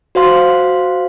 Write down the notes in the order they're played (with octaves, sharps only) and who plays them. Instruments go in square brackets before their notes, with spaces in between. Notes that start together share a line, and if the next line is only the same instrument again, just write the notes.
[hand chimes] F#4 C5 F5 C6